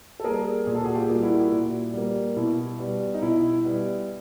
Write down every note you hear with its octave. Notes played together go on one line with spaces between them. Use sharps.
A4
G3 A#3 G#4 A#4
A#2 G#4
A4
F#4 G#4
F4 G4
G3 A#3
G4
E4 F#4
A#2
G3 A#3
B2 E4
G3 B3
D#4
B2 E4
G3 B3